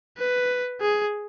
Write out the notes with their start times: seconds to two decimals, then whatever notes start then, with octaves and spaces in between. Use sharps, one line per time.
0.18 B4
0.81 G#4